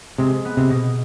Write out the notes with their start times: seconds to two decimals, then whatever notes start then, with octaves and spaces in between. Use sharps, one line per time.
0.18 C3 G#3
0.45 B3
0.57 C3
0.70 B2